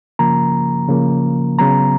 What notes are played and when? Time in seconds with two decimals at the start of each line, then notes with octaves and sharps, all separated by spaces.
0.19 C#3 F3 A#3 A#5
0.89 C#3 F3 A#3
1.59 C#3 F#3 B3 A#5